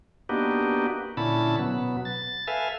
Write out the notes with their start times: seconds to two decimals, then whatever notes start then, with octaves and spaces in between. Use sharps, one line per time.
0.29 A#3 B3 D4 D#4 F#4 G4
1.17 A#2 D3 C#4 E4 A5 B5
1.59 B2 F#3 B3
2.05 A6
2.47 A4 B4 E5 F5 G#5